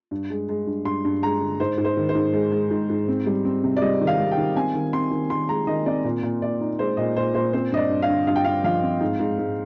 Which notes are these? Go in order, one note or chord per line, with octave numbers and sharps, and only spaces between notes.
G2
G#3
G#3
G2
G2 C6
G2
G#3 A#5
D3
G#2 C5
G#2
C5
D#3
C5
G#2
G#3
G#3
G#2
G#2
C4
G3
C4
C3
D5
G3 D#5
D#3
F5
G3
G5
D#3
C4 G#5
D#3
C4 C6
D#3
D#3 C6
G#3 A#5
D#3 D#5
C4 D5
A#2
A#2
A#2 D5
D#4
G#3 C5
A#2 D#5
A#2 C5
A#2 C5
C4 C5
G2 D#5
D5
G2
F5
D3
G2 F5
G5
G2 F5
F3 F5
C4
G#2
G#2
G#2